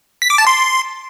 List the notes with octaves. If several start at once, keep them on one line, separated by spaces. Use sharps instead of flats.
B6
D6
A5
C6